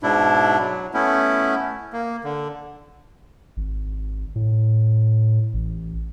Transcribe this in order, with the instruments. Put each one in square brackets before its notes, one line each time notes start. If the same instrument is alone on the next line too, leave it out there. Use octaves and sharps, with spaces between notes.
[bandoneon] G#2 B2 D4 E4
F#3
A3 B3 C#4 E4
A#3
D3
[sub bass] G#1
A2
A1